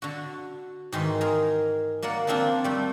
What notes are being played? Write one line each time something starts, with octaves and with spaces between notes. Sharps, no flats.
D3 F#4
G#2 D#3 E3 C6
G#4 A#4
A#3 A#4 D5 F#5
F3 A#3 C4 D4 F4
G3 A3